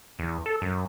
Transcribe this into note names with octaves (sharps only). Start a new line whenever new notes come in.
E2
A4
F#2